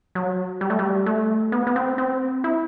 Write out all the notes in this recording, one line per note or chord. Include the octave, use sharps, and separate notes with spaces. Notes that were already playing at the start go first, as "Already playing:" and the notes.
F#3
G3
A3
G3
A3
B3
B3
C4
C4
E4